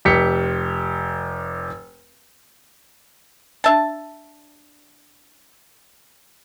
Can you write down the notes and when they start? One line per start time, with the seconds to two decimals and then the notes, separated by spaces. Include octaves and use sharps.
0.05 F1 G4 B6 C#7
3.64 D4 E5 A5